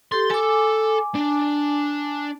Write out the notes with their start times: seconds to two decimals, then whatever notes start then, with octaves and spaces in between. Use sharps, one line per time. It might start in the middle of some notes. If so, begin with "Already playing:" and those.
0.12 G4 A4 C6
0.30 A4 G#5 D6
1.15 D4